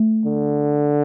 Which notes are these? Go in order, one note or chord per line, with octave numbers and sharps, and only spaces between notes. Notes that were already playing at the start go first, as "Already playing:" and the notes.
Already playing: A3
D3